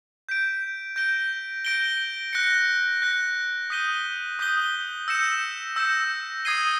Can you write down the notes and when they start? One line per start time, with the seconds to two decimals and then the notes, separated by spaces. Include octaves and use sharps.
0.29 G6 B6 D7
0.96 G6 A#6 D7 G7
1.65 G6 A#6 D7 G7
2.33 F#6 A#6 C#7
3.02 F#6 A#6 C#7
3.70 D#6 G6 B6 D#7 G7
4.39 D#6 G6 B6 D#7 G7
5.08 E6 G6 A#6 C#7 E7
5.76 E6 G6 A#6 C#7 E7
6.45 D#6 G#6 C7 D#7 G7